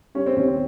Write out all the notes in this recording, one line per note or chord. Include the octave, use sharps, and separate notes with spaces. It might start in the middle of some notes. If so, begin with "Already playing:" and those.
G3 C#4
C4
D#2 C#4
C4